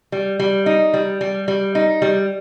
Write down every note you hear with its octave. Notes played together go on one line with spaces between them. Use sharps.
G3
G3
D#4
G3
G3
G3
D#4
G3